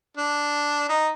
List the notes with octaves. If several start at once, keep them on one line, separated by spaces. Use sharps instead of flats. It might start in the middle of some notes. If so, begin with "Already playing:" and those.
D4
D#4